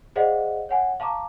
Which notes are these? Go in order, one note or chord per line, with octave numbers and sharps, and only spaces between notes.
G#4 C5 D5 D#5 F5 F#5
C#5 F#5 G#5
F5 A5 A#5 C#6 D6